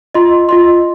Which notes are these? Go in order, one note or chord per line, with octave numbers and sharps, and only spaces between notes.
F4 D#5 C6
F4 D#5 C6